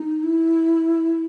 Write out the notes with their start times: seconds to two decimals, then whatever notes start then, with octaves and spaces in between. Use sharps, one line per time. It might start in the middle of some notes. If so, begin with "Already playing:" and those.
Already playing: D#4
0.23 E4